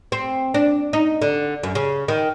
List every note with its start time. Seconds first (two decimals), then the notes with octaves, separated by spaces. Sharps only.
0.12 C4
0.54 D4
0.93 D#4
1.22 D3
1.63 F#2
1.75 C#3
2.08 D#3